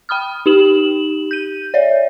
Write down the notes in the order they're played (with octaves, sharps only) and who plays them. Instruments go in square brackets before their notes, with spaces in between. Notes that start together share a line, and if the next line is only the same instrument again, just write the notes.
[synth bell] G5 B5 D#6 F6
D#4 G4 E7 F#7
G6 D#7
C#5 D5 E5